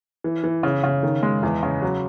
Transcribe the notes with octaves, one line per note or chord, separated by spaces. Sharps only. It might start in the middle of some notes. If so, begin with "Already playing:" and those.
E3
E3
C#3
C#3
D#3
G#3
E2
C#3
F#3